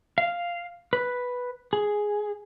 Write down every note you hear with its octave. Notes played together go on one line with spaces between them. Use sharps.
F5
B4
G#4